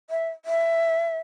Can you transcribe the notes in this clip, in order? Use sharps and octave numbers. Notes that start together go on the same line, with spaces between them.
E5
E5